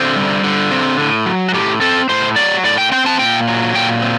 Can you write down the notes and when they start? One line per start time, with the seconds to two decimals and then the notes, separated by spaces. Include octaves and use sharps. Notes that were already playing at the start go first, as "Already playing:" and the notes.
Already playing: D3 C4 C5
0.16 G3
0.44 D3
0.71 C4
0.99 A2
1.26 F#3
1.49 F#4
1.54 A2 G4
1.81 C4 A4
2.09 A2 C5
2.36 F#3 D5
2.64 A2 D5
2.78 G5
2.92 C4 G5
3.06 A5
3.19 A#2 G5
3.47 F#3
3.75 A#2 G5
4.02 C4